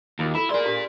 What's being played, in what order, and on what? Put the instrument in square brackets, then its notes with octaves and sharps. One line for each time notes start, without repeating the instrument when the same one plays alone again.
[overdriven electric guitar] D#2 [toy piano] F4 F#4
[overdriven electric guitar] E4 [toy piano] A4 B5
[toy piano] G#4 D5 [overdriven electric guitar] A#4 C6
[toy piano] D4 G4